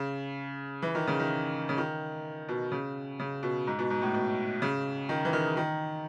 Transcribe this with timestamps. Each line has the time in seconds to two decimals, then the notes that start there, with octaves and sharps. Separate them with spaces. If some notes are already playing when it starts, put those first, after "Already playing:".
Already playing: C#3
0.82 E3
0.95 D#3
1.07 C#3
1.20 D#3
1.69 C#3
1.78 D#3
2.49 B2
2.72 C#3
3.19 C#3
3.43 B2
3.67 G#2
3.79 B2
3.90 G#2
4.02 A2
4.14 B2
4.62 C#3
5.09 D#3
5.25 E3
5.33 D#3
5.57 D#3